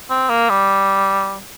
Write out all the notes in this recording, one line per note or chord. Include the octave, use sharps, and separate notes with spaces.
C4
A#3
G3